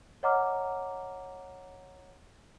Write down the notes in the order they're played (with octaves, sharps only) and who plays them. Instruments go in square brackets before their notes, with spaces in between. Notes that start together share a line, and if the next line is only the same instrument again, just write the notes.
[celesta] C#5 D#5 F#5 A#5 D6 F6